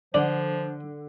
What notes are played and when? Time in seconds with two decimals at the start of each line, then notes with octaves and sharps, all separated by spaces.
0.14 D3 F3 D5